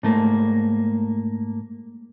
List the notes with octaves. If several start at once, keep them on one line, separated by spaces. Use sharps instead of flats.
G#2 A3 A#3